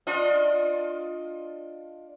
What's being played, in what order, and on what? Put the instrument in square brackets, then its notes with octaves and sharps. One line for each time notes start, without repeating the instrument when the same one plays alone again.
[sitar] D4 F4 D#5